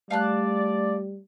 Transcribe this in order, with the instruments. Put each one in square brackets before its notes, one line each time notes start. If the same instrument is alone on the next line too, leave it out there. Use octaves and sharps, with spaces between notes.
[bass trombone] G3 [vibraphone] A3 [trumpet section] D5 [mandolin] F5 A5 F#6